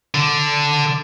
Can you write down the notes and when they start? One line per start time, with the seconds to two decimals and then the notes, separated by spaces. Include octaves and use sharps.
0.14 D3